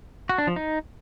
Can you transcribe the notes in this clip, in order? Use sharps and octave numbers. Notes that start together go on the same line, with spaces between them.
F#4
D4
F3
D#4